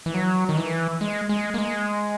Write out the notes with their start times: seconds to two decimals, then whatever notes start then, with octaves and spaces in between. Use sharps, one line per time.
0.06 E3
0.14 F#3
0.49 D#3
0.57 E3
1.01 G#3
1.29 G#3
1.54 A#3
1.58 G#3